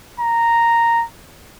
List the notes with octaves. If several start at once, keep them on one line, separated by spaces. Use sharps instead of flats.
A#5